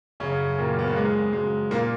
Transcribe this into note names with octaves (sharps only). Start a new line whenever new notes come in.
F#2 C#3 C#4
A#2 D#3 F#3 A#3
B3
A#3
F2 G#3
C#3 F#3 G#3
A#2 A#3